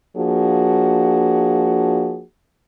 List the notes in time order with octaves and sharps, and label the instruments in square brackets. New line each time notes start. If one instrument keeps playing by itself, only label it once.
[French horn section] F3 A#3 D4 F#4 G#4